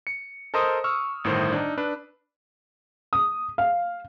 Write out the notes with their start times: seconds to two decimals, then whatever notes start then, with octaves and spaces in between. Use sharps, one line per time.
0.07 C#7
0.54 A4 A#4 C5 D#5 C6 D#6
0.84 C#6 E6 F6
1.24 G1 A2 D#3 C5
1.52 D4 D#4
1.78 D4 B4
3.13 D#6
3.58 F5